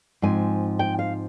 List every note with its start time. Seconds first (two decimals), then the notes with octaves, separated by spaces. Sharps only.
0.22 G#2 F3 C4 G#5
0.79 G5
0.99 F5